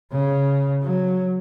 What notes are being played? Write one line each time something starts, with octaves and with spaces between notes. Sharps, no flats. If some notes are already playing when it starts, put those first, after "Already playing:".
C#3
F#3